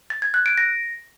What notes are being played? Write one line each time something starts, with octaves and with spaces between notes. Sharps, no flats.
A6
G#6
F#6
D7
A#6